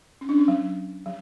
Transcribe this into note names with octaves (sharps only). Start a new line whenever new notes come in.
C#4
D4
C#4
F#3
F#3